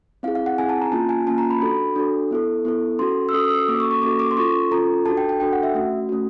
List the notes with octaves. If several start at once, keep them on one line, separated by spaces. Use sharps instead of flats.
C4 E4 G#4 F5
F5
F#5
C4 E4 G#4 G#5
A5
A#5
A#3 C#4 F4 A5
G#5
A#3 C#4 F4 A5
A#5
B5
D4 F#4 A4 B5
D4 F#4 A4
B3 E4 A4
B3 E4 A4
C#4 F#4 A4 C6
E6
C#4 F#4 A4 D#6
D#6
E6
A#3 C#4 F#4 A4 D6
C#6
C#6
A#3 C#4 F#4 A4 D6
D6
C6
C#4 F4 A4 C#6
C#4 F4 A4 A#5
D4 F#4 A4 A5
G5
G5
D4 F#4 A4 G5
F#5
E5
A3 C#4 F#4
A3 C#4 F#4